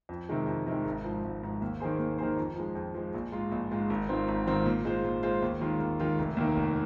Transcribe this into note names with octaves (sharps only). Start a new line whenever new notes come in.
F2
C3 D#3 G#3
F2
C3 D#3 G#3
G#1
G#2 F3
G#1
G#2 F3
D#2
D#3 A#3 G#4 C5
D#2
D#3 A#3 G#4 C5
F2
F3 G#3
F2
F3 G#3
A#1
G#2 G#3 F4
A#1
G#2 G#3 F4
G#1
G#2 D#3 C4 F4
G#1
G#2 D#3 C4 F4
A#2
G#3 F4 C5
A#2
G#3 F4 C5
D#2
D#3 G#3 F4
D#2
D#3 G#3 F4
F1
D#2 D#3
F1